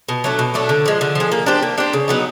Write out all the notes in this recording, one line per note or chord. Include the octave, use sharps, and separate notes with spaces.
B2
F#3 A3 D4
B2
F#3 A3 D4
D3
F3 G#3
D3
F3 G#3
A#3
D4 G4 C5
A#3
D4 G4 C5
C#3
F#3 B3 D#4